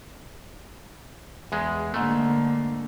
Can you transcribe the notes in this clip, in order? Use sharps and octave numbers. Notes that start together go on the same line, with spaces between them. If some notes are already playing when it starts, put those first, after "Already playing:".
E2 G#3
G#2 D3 A3 A#3